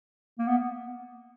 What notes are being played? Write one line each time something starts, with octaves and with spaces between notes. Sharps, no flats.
A#3
B3